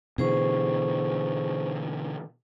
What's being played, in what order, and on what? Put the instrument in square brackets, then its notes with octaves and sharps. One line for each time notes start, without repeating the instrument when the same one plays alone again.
[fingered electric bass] B2 D3 E3 [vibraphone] G#4 C5 C#6